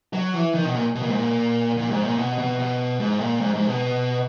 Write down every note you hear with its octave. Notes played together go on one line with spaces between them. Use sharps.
F#3
E3
D#3
B2
A#2
B2
A#2
G#2
A#2
A#2
G#2
A#2
B2
B2
B2
G#2
A#2
G#2
G#2
B2